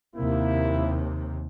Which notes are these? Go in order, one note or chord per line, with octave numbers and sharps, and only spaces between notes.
D#2 C3 A#3 E4